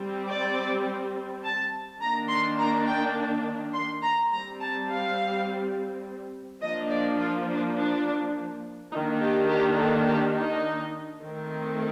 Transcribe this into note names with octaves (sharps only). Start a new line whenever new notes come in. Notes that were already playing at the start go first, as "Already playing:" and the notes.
Already playing: G3 C4
D5
A5
D#3 A#3 D4 A#5
C6
A#5
G5
C6
A#5
G3 C4 A#5
A5
F5
F3 A#3 D4 D#5
D5
F4
D4
D4
D#3 A#3 D4 D#4
G4
G4
A4
G4
D#4
D#3 A3 C4